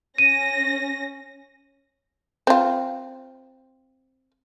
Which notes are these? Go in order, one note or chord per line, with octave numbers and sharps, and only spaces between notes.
C#4 A#6 D#7
C4 F4